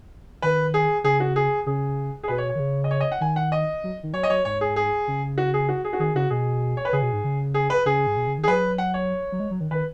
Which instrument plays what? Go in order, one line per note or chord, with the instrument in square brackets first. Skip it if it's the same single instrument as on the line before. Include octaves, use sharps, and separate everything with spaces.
[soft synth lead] D#3 [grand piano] B4
[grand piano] G#4
[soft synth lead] C#3 [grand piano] G#4
[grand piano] F#4
G#4
[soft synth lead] C#3 [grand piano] G#4
[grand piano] G#4
[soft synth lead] B2 [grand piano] B4
[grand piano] C#5
C#5
[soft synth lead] D#3
C#3
[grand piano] D#5
C#5
D#5
F#5
[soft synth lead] D#3 [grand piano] G#5
[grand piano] F#5
D#5
[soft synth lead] F#3
D#3
[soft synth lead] F#3 [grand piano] C#5
[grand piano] D#5
[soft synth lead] F#3 [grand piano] C#5
[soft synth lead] G#2 [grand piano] C#5
[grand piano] G#4
G#4
[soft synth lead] C#3
[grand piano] F#4
G#4
F#4
G#4
F#4
[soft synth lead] D#3 [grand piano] G#4
[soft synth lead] C#3 [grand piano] F#4
[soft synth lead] B2 [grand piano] G#4
[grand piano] C#5
B4
[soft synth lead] C#3 [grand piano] G#4
[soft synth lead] B2
G#2
C#3
[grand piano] G#4
B4
[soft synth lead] C#3 [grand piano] G#4
[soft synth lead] G#2
B2
C#3
D#3
[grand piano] G#4
[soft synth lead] F#3 [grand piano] B4
[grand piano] F#5
C#5
[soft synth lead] F#3
G#3
F#3
D#3
[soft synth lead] D#3 [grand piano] B4